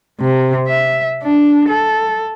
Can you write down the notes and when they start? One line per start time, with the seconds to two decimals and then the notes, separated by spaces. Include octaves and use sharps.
0.20 C3
0.67 E5
1.23 D4
1.69 A4